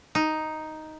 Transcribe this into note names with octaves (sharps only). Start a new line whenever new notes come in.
D#4